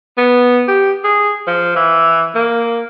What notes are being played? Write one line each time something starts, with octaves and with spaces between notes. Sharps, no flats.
B3
G4
G#4
F3
E3
A#3